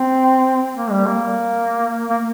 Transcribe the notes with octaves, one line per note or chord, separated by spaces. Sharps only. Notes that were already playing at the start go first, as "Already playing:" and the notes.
Already playing: C4
A#3
G3
A#3
A#3